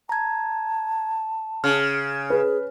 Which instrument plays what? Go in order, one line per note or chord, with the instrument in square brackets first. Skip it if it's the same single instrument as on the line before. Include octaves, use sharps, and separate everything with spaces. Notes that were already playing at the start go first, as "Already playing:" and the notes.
[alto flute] A5 [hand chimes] A#5 G#6
[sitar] C#3 [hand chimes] F6
[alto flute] G#4 [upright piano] B4